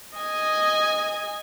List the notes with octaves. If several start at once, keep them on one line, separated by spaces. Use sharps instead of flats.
D#5 G#5